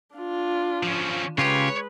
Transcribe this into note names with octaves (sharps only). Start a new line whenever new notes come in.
D4 F4
F3 C#4
C#3 G#3 F4 G4 B4 C#5